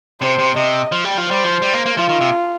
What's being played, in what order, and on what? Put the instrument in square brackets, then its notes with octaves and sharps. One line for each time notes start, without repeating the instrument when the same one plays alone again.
[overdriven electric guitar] C3 [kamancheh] C5
[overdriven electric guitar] C3
[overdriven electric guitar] C3 [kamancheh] D#5
[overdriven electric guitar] F3
G3
F3
[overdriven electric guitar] G3 [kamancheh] C5
[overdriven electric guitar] F3
G3
A#3
A#3
[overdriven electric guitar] F3 [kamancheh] F4
[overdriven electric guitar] D#3
C3